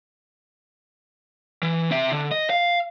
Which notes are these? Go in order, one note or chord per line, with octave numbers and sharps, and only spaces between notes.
E3
C4 E5
D3
D#5
F5